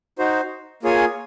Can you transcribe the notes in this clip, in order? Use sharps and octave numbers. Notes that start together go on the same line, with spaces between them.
D#4 F#4 C5
A#3 F4 G#4 C#5 G#5